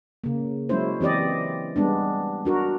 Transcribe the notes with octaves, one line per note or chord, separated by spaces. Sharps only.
C#3 A#3
F#3 G#3 C#4 E4 C5
E3 C4 G4 D5 D#5
G3 G#3 B3 D4
D4 F#4 A#4